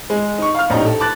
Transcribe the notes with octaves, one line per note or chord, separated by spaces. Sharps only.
G#3
D#4 C#6
F5 F6
A#1 A2 D#4 G4 A#5
A4
A5 D6 F#6 A6